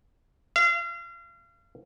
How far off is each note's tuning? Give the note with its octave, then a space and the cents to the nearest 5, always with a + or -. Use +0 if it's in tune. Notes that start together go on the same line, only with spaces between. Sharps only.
F5 -35